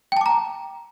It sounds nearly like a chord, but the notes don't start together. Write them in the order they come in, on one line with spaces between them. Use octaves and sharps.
G5 A5 D6 A#5